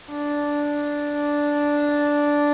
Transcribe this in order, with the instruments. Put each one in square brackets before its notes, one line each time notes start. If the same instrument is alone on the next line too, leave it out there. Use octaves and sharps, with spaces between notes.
[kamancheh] D4